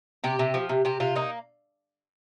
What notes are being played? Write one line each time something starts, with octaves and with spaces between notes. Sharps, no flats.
C3 G4
C3
F3
C3
C3 G4
C3 F4
A#3 D#4